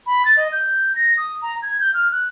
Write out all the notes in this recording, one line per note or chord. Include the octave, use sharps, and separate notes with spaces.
B5
A6
D#5
G6
A#6
D#6
A#5
G#6
G6
F6
F#6